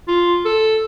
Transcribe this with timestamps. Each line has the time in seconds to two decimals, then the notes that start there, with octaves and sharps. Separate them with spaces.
0.08 F4
0.45 A4